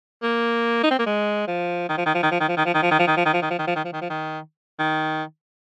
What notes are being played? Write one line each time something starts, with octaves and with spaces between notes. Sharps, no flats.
A#3
D#4
C4
A#3
G#3
F3
D#3
F3
D#3
F3
D#3
F3
D#3
F3
D#3
F3
D#3
F3
D#3
F3
D#3
F3
D#3
F3
D#3
F3
D#3
F3
D#3
F3
D#3
F3
D#3
D#3